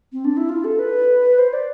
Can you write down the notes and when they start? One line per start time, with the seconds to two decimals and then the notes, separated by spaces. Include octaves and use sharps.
0.13 C4
0.25 D4
0.37 E4
0.49 F4
0.64 A4
0.79 B4
1.38 C5
1.53 D5